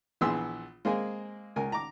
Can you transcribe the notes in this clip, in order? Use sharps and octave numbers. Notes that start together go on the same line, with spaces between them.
A#1 E3 B3 G#4 C6 E6
G#3 A#3 C4 G#4 G#5
C#2 A#4 G#5
A#5 D6